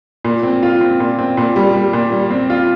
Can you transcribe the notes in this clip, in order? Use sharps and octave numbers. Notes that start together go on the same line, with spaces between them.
A#2
C4
F4
C4
A#2
C4
A#2
G3
G3
A#2
G3
C4
F4